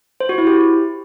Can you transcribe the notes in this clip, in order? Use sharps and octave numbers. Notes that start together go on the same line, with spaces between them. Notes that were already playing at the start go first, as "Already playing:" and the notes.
C5
F#4
E4
G4